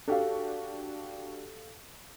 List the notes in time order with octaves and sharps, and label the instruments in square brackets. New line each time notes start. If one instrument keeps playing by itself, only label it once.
[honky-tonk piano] D4 F#4 G4 [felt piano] A4 F5